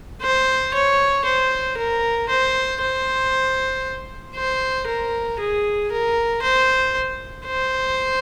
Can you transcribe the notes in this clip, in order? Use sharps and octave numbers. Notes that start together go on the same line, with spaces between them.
C5
C#5
C5
A#4
C5
C5
C5
A#4
G#4
A#4
C5
C5